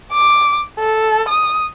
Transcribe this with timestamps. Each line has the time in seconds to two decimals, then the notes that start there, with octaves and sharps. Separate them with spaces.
0.12 D6
0.79 A4
1.28 D#6